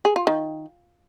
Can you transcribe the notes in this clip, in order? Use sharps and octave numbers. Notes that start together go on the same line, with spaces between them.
G#4
F4
D#3